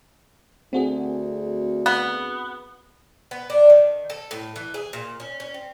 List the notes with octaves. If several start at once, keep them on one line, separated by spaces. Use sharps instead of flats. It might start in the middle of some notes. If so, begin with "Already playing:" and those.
D2 C4 F#4 G#4
B3
B3
D4
D#3
A4
A2
E3
G#4
A#2
C#4
C#4
C4